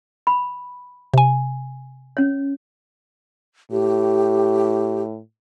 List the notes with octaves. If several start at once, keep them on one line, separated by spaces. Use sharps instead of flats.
B5
C3 G#5
C#4 C#5
A2 G4